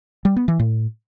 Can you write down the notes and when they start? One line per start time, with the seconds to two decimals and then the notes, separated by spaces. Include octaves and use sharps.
0.25 G3
0.36 B3
0.48 E3
0.59 A2